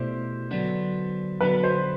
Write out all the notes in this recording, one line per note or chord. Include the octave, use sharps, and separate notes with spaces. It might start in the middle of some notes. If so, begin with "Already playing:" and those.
Already playing: B2 A3 E4 G4 C5 D5
D3 F#3 B3 D4
D3 F#3 B3 D4 B4
C5